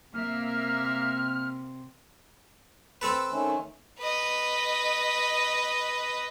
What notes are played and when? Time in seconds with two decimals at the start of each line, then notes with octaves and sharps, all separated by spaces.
0.14 C3 A#3 E5 F6
3.01 C4 A4 B4
3.31 D#3 A3 C#4
3.99 B4 D#5